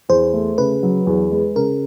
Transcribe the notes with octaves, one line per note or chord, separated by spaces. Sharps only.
E2 C5
A3
C#3 B4
F#3
E2
G#3
C#3 A#4